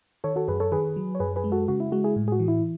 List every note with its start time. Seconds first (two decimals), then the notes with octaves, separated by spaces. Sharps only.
0.24 D#3 A4 C#5
0.36 F#4 A4
0.48 F#2 G#4 B4
0.60 A4 C#5
0.72 D#3 G#4 B4
0.96 F#3
1.15 C#5
1.20 F#2 G#4 B4
1.36 G#4 B4
1.44 G#3
1.52 F#4 A4
1.68 C#3 F#4
1.80 E4
1.92 G#3 F#4
2.04 E4 G#4
2.16 A2
2.28 G#4
2.32 F#4
2.40 E3
2.48 E4